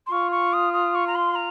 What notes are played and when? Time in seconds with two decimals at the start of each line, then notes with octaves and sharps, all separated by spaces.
0.07 C6
0.12 F4 C#6
0.32 C#6
0.53 D#6
0.73 D#6
0.95 C#6
1.07 A#5
1.15 C6
1.35 A#5